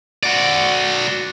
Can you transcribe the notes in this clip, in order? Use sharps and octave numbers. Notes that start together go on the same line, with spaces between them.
F#4 D5